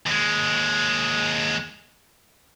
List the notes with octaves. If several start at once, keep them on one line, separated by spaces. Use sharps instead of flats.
D#2 G#3